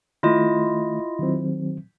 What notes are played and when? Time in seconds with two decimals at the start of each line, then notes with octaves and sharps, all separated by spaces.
0.23 D#3 A3 E4 F4 D#5
1.19 D#3 F#3 C4